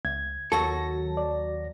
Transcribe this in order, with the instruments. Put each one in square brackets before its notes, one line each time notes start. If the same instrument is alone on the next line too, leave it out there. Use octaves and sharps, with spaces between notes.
[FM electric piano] C#2 [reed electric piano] G#6
[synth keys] D#2 F#3 A#6 [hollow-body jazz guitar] F#4 A4 [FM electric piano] A5
[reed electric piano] D5